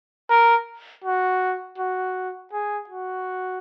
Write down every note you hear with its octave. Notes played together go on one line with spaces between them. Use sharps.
A#4
F#4
F#4
G#4
F#4